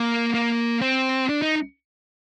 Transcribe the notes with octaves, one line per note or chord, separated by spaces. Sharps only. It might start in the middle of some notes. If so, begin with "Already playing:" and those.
Already playing: A#3
A#3
C4
D4
D#4